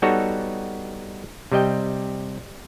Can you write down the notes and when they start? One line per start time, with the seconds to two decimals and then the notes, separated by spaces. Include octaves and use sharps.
0.02 G3 B3 D#4 F#4 A4 C#5
1.52 C3 G3 D#5 G5